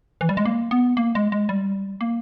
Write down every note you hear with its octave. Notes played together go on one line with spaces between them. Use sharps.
E3
G3
G#3
A#3
B3
A#3
G#3
G#3
G3
A#3